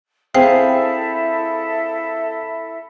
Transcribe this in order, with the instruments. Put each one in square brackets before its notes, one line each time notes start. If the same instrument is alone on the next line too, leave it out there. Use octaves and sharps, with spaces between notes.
[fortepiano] C4 G#4 F5 [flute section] E4 A4 E5 [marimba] C5 G5